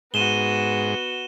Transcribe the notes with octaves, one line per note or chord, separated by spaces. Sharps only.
G#2 B3 F#4 D#7 E7 G7